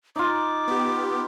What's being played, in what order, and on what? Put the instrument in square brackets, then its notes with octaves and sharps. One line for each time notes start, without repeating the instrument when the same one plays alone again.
[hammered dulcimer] D#4 F4 [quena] D6
[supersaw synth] B3 G4